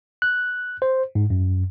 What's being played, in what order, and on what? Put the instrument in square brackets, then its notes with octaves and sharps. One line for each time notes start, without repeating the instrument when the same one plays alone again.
[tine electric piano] F#6
C5
G#2
F#2